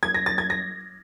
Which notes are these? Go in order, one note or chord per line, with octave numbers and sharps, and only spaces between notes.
G#6
A#6
A6
G#6
A#6